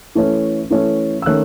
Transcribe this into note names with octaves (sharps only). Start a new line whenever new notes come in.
E3 A3 C#4
E3 A3 C#4
E6
D#3 A3 C#4 F#6